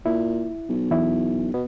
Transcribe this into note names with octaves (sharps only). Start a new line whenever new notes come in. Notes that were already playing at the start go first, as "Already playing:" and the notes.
A#2 E4
B1
E2 E4
B2 B3